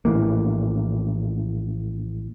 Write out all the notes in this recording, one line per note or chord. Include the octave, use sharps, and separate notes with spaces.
A#1 A2 E3 A#3